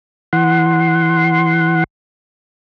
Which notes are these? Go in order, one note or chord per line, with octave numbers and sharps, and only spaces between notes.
E3 F#5 C6